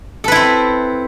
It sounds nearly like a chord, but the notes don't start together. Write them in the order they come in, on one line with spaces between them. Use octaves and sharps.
A4 B4 E4 C4